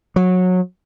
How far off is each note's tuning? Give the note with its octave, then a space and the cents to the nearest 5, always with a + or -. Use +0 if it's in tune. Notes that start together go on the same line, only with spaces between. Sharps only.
F#3 -20